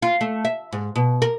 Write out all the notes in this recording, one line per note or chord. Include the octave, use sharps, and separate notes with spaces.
F4
A3
E5
G#2
B2
A#4